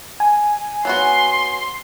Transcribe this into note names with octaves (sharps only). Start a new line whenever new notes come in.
G#5
F#3 B3 F#4 C6